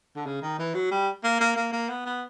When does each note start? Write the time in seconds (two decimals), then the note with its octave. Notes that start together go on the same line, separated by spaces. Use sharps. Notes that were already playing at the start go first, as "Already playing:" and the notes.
0.15 D3
0.26 C#3
0.42 D#3
0.59 E3
0.74 F#3
0.91 G3
1.24 A#3
1.40 A#3
1.56 A#3
1.72 A#3
1.89 B3
2.05 B3